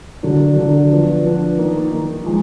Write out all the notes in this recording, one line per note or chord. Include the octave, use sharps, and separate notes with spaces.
D3 F#3 D4
D3 F#3 D4
F3 B3 D4
F3 B3 D4
D#3 A#3 D#4
D#3 A#3 D#4
F3 G#3